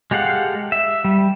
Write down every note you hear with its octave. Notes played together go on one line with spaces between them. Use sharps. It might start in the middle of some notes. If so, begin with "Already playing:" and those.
G#3 G4 A4 F5 F#5
E5
G3